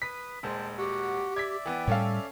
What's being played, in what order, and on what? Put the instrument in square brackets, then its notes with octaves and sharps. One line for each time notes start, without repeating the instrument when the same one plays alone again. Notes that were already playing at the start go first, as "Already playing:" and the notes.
[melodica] B4 D#6 [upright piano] B6
[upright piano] D#1 G#3 C5 [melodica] G5 A5
[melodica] F#4 F#5 [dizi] G4
[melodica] D5 E5 [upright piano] G#6 B6
[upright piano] E3 B3 [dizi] G5
[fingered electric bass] A2 G3 [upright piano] C#4 A4 F5